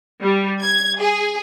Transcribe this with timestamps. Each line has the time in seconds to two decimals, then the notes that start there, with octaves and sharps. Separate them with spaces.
0.23 G3
0.61 G#6
1.00 G#4